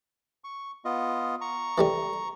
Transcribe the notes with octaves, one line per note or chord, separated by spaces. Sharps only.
C#6
B3 F4 D#5
A#5 C#6
E3 G3 A3